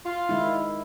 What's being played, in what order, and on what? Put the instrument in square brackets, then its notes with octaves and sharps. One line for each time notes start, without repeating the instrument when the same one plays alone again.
[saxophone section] F4
[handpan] D#3 G#3 E4